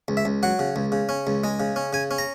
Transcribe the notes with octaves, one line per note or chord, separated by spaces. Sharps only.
C#2
E5
C#2
F#3 F#5
C#3
C#2
C#3
C#4
C#2
G#3
C#3
C#4
C#3 G#5
C#4
A#5